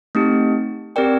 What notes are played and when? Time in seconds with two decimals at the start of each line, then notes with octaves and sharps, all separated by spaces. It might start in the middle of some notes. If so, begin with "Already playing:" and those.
0.15 A3 C4 D#4 G4
0.96 C4 G4 A#4 D5 G5